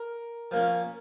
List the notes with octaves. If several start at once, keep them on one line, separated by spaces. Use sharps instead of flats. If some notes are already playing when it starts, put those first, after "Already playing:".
Already playing: A#4
F3 A#3 C#4